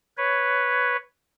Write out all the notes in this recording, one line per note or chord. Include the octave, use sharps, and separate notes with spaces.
B4 C#5